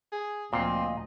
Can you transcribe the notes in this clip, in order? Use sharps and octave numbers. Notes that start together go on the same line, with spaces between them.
G#4
D2 A#2 F3 C4 D#5 F5